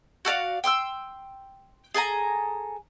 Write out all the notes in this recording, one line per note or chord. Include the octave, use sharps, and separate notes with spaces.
F#4 A4 D5 F5
G5 C6 D#6 E6
G#4 A4 G#5 A#5